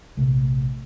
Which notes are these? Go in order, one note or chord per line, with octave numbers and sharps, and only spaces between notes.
A#1 C3 A3